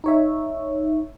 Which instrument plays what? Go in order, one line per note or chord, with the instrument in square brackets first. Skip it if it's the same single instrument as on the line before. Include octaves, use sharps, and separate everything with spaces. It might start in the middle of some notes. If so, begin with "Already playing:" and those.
[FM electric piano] D#4 C#5 E5